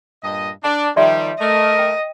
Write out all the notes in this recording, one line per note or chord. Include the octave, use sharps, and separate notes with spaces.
G2 A#2 D#5
D4
D#3 F3 G3 D5 E5 C6
A3 A#4 D#5
G5